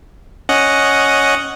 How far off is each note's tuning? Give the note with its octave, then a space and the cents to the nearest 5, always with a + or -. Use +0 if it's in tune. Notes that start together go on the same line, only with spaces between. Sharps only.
C#4 +0 D#5 +0 F#5 +0